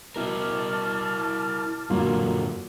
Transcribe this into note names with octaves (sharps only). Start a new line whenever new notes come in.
B2 E4 A#4 A5 D6 F6
F#2 A#2 D3 F#3 A#3 F4